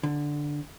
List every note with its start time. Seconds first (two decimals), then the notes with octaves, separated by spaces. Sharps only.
0.03 D3